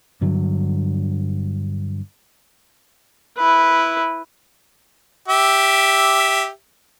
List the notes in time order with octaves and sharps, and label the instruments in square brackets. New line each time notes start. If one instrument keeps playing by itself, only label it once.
[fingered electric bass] G2 D3 F#3
[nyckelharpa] E4 B4
[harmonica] G4 E5